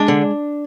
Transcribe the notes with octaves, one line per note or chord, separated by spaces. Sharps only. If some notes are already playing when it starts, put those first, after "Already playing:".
Already playing: G#3 D4
D3